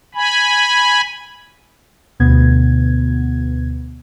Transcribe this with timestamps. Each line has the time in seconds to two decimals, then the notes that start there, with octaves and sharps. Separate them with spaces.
0.15 G#5 B5
2.20 D2 B2 B3 G#6